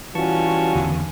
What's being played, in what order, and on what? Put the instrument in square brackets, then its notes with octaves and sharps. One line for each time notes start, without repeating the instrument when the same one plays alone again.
[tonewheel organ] E3 A5 C#6 [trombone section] G3 F4 F#4 [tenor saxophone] C#4
[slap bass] E2 D3 D#3